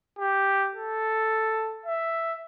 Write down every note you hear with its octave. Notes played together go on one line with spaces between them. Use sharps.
G4
A4
E5